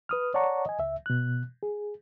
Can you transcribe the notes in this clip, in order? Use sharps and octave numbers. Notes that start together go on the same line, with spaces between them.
B4 D#6 F6
C#5 D5 F#5 A5 A#5 C#6
D#5 G#5
C#2 E5
B2 F#6
G#4